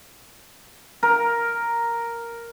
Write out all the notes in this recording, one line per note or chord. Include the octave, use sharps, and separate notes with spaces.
A#4